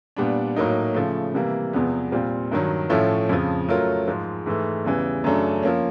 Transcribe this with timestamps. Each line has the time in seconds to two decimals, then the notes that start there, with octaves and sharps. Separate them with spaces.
0.16 A#2 G3 B3 D4
0.56 A2 F#3 A#3 D#4
0.94 C#3 F3 A3
1.34 C3 E3 G3 A#3
1.73 E2 C3 F3 G#3 B3
2.12 A#2 G3 C4 F4
2.52 G2 D#3 F#3
2.90 A2 F3 A3 C#4 E4
3.29 F2 C#3 F3
3.68 F#3 A3 C#4 F4 A#4
4.07 G#2 F3 G#3
4.46 G#2 E3 A3
4.85 E2 C#3 E3 G3
5.24 F#2 C#3 F#3 A3 D4
5.63 F3 A#3 C#4